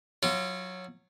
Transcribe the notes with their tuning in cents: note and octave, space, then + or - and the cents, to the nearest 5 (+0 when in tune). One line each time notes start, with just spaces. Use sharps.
F#3 -15 F4 -35